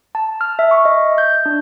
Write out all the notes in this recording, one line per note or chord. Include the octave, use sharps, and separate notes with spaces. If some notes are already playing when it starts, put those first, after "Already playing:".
A5
F6
E5
C#6
D#5
G6
D4